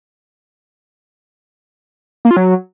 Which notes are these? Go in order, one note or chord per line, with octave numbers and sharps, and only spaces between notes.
A#3
F4
F#3